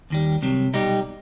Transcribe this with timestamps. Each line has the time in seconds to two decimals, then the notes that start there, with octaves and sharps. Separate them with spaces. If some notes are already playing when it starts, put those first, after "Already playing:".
0.10 D#2 D#3 G3
0.42 C2 C3 F#3
0.74 B1 B2 G3 D#4 G4